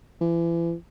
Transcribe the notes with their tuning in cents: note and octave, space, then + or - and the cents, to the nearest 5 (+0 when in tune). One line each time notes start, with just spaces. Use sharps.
E3 +35